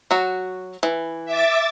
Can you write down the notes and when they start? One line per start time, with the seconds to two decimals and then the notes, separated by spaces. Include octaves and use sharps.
0.11 F#3 F#4
0.83 E3
1.25 E5 D6 A6